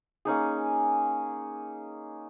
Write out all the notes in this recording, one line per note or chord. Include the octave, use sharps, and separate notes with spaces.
A#3 C#4 D#4 G#4